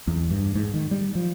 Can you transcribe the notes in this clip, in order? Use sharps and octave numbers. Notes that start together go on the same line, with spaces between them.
E2
G2
G#2
D#3
G3
F3